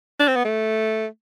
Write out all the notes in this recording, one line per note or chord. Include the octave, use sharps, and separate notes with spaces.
D4
C4
B3
A3